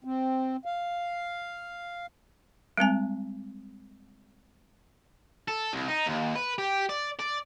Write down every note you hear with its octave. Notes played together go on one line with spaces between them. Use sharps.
C4
F5
G3 G#3 C4 G#5
A4
C2
D#4
D#2
B4
G4
D5
D5